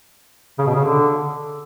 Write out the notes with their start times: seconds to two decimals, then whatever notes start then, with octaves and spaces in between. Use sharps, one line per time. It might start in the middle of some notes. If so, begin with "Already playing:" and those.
0.59 C#3
0.67 B2
0.76 C#3
0.84 D3